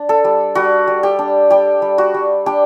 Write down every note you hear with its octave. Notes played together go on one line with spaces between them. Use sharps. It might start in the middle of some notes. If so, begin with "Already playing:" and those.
Already playing: D4
A4
G3
G3 F#4
G3
G4
D4
G3 G4
G3
F#4
G3
D4 G4